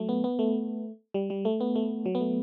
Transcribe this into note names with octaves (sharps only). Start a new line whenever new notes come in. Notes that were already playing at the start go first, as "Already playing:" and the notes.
Already playing: F#3 A3
B3
B3
A3
G3
G3
A3
B3
A3
F#3
B3
A3